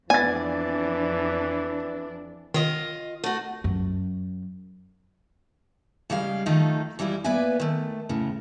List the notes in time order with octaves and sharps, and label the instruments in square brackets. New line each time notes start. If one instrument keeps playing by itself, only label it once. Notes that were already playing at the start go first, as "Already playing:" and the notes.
[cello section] F2 D4 [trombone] E3 [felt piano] B3 A6 [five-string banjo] G#5
[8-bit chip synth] D#3 [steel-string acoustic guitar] F4 D#5
[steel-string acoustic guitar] A3 F#4
[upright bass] F#2
[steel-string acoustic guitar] C#3 G3 G#3 F5
D#3 F3 A3 D#4 A4
E3 G3 G#3 E4 F4
A#3 B3 B4 D5 E5 G#5
D#3 A3
D2 A2 C#3